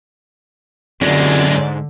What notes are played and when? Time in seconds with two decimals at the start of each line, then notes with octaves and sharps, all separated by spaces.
1.02 F#2 D3 G#3 C4 F4 G4 D5
1.48 F2 G#2